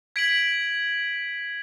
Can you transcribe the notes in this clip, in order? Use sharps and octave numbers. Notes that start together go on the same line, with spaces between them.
G#6 B6 D7 F#7